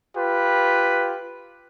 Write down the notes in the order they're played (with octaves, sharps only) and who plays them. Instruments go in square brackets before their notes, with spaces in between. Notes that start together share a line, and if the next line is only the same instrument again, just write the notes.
[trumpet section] F4 G4 B4